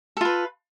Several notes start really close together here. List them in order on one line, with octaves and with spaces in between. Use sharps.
A4 F4 B4